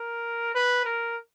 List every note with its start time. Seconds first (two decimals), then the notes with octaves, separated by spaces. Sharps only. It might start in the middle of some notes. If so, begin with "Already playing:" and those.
Already playing: A#4
0.55 B4
0.85 A#4